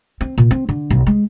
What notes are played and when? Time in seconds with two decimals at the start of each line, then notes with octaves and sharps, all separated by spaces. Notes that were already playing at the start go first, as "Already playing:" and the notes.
0.21 C4
0.38 A#2
0.51 C4
0.69 D3
0.90 B1
1.06 G#3